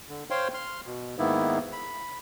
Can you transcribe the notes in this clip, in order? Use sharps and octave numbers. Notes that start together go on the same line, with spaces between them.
D3
C5 C#5 F5 G5 C6
C6 F6
B2
G#2 D#3 A#3 B3 E4
B5